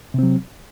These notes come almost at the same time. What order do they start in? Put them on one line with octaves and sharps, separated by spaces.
C3 C4 F#3